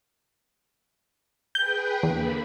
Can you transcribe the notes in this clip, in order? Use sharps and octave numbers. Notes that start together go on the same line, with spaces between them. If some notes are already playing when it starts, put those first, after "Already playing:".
G#4 B4 G5 G6
E2 D3 A#3 B5